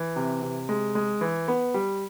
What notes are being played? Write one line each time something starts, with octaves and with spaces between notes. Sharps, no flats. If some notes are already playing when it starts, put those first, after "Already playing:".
Already playing: E3
C3
C3
G#3
G#3
E3
B3
G3